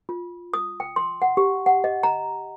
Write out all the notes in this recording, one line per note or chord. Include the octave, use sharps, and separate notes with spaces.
F4
D#6
G5
C6
F#5
G4
F#5
D#5
A#5